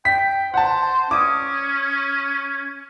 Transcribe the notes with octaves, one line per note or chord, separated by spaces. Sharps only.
G5 B6
C5 F#5 A5
C#4 D6 D#6